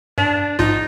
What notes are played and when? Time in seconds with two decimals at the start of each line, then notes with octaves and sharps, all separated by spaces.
0.18 G2 D4
0.59 A#1 G#2 D#4 F4